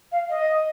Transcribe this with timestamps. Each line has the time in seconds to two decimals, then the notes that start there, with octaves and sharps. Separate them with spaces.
0.12 F5
0.29 D#5